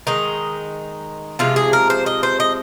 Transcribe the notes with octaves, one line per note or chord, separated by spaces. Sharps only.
D#3 G#3 D#4
C3 F3 G#3 F4
G#4
A#4
C5
D#5
C5
D#5